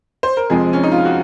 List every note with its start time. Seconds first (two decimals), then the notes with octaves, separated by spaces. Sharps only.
0.23 C5
0.37 A#4
0.50 F2 C3 F3 G#3 G#4
0.73 C#4
0.83 D#4
0.92 F4
1.05 F#4